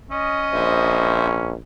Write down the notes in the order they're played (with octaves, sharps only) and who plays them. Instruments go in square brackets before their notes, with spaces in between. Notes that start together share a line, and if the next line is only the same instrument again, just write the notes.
[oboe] C#4 [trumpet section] D#5
[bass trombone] A#1 [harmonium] C5 E5